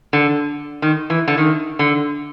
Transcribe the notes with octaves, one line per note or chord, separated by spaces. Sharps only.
D3
D#3
E3
D3
D#3
D3